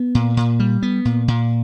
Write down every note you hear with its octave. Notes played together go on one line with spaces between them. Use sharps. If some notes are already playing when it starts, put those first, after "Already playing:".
Already playing: B3
A#2
A#2
G3
B3
A#2
A#2